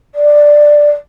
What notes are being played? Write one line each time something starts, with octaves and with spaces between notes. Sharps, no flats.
D5